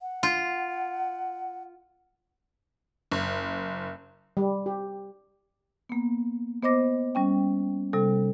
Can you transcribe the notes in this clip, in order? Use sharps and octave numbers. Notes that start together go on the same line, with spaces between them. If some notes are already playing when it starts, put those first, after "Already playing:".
F#5
F4
F#1
G3
G4
A#3 B3
B3 C5 D#5 D6 A#6
G3 C#4 G5
C3 G3 A4